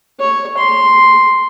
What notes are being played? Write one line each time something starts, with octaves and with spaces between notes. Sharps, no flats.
C#5
C6